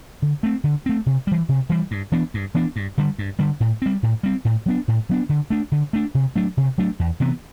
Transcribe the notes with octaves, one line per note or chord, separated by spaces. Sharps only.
D3
A3 C4
D3
A3 C4
C3
E3 G3
C3
E3 G3
G2
E3 B3 D4
G2
E3 B3 D4
G2
D3 G3
G2
D3 G3
A2
G3 C4
A2
G3 C4
A2
F#3 B3 D4
A2
F#3 B3 D4
D3
A3 D4
D3
A3 D4
C3
F#3 A3 D4
C3
F#3 A3 D4
E2
C3 E3 B3